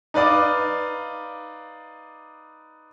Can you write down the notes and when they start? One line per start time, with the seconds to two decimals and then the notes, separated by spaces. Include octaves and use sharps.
0.14 D#4 B4 D5 F5 D6